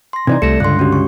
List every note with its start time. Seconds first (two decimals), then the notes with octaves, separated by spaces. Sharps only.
0.13 C6 A#6
0.27 C3 E3 D#4 D5 G#6
0.42 C2 A3 A#6 C#7 E7
0.60 C#2 G2 D3 C6 F#6
0.79 C#4 F#4 G4
0.92 C#6